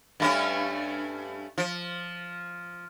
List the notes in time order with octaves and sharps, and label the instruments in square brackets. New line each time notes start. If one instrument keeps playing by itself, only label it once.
[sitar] G2 A3 C#4
F3